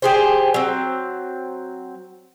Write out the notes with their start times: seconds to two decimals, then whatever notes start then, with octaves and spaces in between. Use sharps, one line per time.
0.02 G4 G#4 C5
0.54 F#3 C4